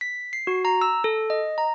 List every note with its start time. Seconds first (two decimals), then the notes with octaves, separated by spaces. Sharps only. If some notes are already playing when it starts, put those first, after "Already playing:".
0.01 B6
0.33 C7
0.47 F#4
0.65 A#5
0.81 E6
1.04 A4
1.30 D#5
1.58 A#5